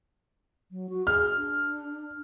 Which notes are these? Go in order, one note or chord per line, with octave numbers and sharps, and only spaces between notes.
F#3
F#4
G#4 F6
D4